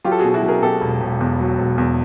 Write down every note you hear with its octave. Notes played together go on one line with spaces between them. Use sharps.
F#3 F4 G4
A4
B2 F#4 G#4
E4 F#4
F#3
G#4 A#4
B2 G4 A4
E1
E1
E2
F#3
E1
E2